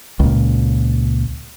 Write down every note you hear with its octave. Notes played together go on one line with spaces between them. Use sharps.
C#2 A#2